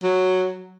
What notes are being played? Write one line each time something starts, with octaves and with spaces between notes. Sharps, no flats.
F#3